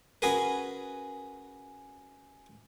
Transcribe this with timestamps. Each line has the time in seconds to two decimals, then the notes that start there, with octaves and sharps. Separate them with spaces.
0.22 C#4 F#4 G#4 A#4 B4